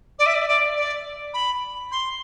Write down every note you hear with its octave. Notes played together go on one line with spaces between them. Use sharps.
D5
E5
D5
E5
D5
D5
B5
C6